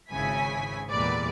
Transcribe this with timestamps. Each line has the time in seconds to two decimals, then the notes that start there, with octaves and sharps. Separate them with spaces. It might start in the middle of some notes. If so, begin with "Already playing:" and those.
0.10 G#1 C#3 E4 G#5 B6
0.90 E2 A#2 G3 G#3 B4 D5